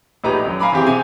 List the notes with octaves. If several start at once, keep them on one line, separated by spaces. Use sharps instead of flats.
A#1 A2 D#4 G4 B4 A#5
F#2
F5 G#5 A#5 B5 D6
E3 C4 G4 G#4
C3 G#5